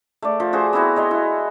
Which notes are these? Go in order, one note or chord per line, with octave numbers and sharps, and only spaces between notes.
A3 D5
F3
F#4 G#4 C5
B3 C4 E4 F#4
C#5 D#5 C6
E4